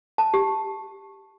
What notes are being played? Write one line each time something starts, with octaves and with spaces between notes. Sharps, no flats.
A5
G4